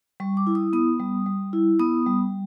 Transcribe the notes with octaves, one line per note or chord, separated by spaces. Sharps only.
G3 C#6
D6
E4
D#6
B3 D#6
G3
G3
E4
B3 D#6
G3